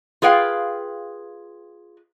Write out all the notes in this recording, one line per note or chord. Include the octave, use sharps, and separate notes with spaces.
F4 G#4 B4 F5 G5